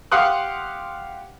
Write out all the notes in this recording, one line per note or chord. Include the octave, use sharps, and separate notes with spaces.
G4 F5 F#5 C6 D#6 F#6